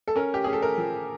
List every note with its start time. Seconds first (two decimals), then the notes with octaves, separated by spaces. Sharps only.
0.07 A4
0.16 C#4 A#4
0.34 G4
0.44 C#4 G#4
0.53 A4
0.62 A#4
0.78 F3